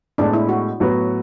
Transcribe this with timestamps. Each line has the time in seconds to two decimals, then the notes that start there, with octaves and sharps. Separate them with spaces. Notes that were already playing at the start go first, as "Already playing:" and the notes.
0.18 A2 G#3 B3 D4
0.33 E4
0.49 F#4
0.80 A2 F#3 B3 F#4 B4